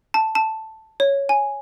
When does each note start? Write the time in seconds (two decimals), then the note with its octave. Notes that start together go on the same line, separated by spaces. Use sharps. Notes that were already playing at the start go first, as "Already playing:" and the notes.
0.14 A5
0.35 A5
1.00 C#5
1.29 G#5